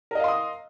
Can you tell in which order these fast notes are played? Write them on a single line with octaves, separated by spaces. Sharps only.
A#4 D#5 F5 C6 D#6